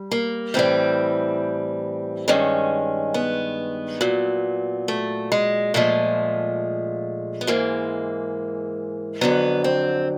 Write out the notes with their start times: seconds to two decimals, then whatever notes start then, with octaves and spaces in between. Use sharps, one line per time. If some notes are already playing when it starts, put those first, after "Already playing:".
Already playing: G3
0.11 A#3
0.54 A2 E3 G3 C4
2.28 G2 D#3 G#3 C#4
3.14 B3
4.01 A#2 F#3
4.88 A3
5.32 G#3
5.74 A#2 F3 G#3 A3
7.41 B3
7.47 G#2 E3 G#3 A#3
9.21 F2 D3 F#3 B3
9.64 C4